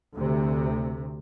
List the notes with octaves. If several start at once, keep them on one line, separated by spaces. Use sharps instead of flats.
D2 C3